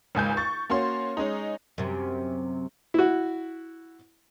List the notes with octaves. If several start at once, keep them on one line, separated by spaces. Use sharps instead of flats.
G#1 C#2 G#5 G6
C#6 A6
A#3 C#4 F#4 C6
G#3 C#4 D#4
F#2 C3
E4 F#4